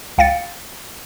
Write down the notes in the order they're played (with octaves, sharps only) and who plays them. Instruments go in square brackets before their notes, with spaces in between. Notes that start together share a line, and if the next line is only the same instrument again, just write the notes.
[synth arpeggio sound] C#2 F5 G5 A6 C#7